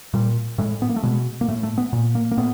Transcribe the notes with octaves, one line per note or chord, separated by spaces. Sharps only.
A#2 G3
A2 G#3
B3
A#3
A3
B2 G#3
A#3
A2 A3
A3
B3
A#2
A#3
A#3
A2 B3